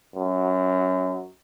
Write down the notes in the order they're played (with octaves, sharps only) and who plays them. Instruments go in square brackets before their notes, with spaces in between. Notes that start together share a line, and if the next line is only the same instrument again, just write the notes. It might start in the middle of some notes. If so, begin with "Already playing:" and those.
[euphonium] F#2